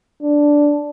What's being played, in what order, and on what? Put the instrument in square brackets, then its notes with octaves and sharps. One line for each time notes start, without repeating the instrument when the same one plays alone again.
[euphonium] D4